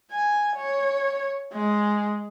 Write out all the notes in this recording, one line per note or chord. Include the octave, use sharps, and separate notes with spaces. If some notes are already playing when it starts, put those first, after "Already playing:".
G#5
C#5
G#3